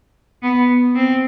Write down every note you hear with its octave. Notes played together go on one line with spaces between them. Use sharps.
B3
C4